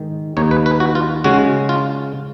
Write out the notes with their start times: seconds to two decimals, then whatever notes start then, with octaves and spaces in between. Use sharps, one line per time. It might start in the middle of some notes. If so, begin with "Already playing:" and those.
Already playing: G#2 D#3 G#3 D#4
0.37 D#2 D#3 A#3 D#4 C#5
0.51 B4
0.66 B4
0.80 F#4
0.95 F4
1.24 C#3 G#3 C#4 F#4
1.69 F4